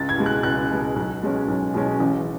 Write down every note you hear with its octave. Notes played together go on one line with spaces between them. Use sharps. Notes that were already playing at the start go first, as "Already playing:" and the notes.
Already playing: C#2 A6
G#6
B2 G#3
F#6
C#2 F#6
B2 G#3
B1
B2 G#3 C#4
B1
B2 G#3 C#4
A1